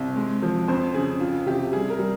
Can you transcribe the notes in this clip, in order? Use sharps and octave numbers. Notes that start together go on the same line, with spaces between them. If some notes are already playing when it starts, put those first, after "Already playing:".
Already playing: C2
G#3
F3
F2 C5
C#3 G#4
F4
C3 G4
G3 G#4
A#4
G3